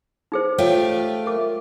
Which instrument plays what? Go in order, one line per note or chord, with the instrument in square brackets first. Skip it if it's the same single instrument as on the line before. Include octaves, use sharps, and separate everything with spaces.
[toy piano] D#4 G#4 C5
[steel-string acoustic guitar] A3 F4 G4 [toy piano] C#5 F5
[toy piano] A#4 D6